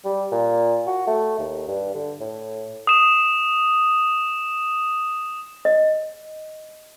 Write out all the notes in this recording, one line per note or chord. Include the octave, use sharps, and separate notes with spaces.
G3
A#2
F#4
A3
D#2
G2
D3
A2
D#6 E7
D#5